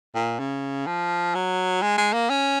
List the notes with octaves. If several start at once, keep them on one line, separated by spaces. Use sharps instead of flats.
A#2
C#3
F3
F#3
G#3
G#3
A#3
C#4